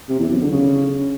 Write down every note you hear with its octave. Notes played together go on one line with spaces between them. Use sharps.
C3
E2
F#2
D3
C#3